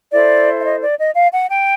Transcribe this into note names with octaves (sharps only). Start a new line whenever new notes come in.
E4 A4 C5 D5
E5
D#5
D5
D#5
F5
F#5
G5